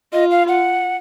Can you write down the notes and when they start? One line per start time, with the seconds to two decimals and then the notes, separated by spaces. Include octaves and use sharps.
0.13 F4 D#5
0.31 F5
0.48 F#5